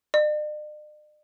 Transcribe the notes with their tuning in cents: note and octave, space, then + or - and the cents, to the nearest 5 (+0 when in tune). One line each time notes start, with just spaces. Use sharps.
D5 +45